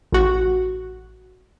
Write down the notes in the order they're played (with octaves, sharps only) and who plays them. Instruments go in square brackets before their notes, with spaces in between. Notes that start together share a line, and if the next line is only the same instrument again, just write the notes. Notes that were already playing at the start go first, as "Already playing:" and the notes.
[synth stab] A1 F#4